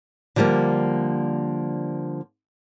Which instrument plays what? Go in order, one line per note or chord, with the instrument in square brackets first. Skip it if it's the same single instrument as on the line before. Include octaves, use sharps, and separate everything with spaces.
[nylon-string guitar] D3 F3 G3 G#3 A#3